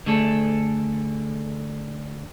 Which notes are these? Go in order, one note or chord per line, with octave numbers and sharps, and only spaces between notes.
D3 A3 G#4 A4